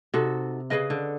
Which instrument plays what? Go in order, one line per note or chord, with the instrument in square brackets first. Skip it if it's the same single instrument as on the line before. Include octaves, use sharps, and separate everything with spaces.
[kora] C3 [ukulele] D#4 F#4 A4
[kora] C#3 [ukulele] G#4 B4 D#5
[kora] D3